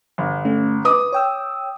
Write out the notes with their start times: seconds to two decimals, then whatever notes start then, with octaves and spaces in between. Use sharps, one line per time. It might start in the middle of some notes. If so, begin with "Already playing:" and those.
0.18 G1
0.45 A3 C#4
0.85 B4 D6 D#6
1.13 C#5 G5 E6